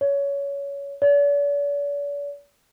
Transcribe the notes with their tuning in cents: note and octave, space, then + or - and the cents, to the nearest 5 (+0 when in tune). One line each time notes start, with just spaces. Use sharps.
C#5 +20
D5 -45